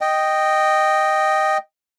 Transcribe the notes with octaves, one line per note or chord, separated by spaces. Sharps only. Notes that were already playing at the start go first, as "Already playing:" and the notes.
D#5 G5